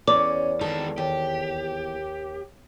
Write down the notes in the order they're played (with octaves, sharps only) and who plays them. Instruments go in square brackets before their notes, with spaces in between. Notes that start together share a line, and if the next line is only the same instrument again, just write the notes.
[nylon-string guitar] E2 C#5 D5 [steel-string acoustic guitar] C#4 [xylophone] D6
[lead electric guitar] D#3 G#3 [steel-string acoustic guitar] A4
[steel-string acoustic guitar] D#2 [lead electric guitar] G4